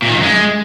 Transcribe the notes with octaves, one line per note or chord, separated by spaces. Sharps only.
A#2
D#3
F#2
G#3